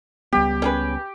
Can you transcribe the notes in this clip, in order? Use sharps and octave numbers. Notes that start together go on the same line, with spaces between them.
C#2 G3 B3 G4
C#4 G#4 B4